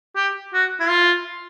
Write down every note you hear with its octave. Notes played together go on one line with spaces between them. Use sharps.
G4
F#4
E4
F4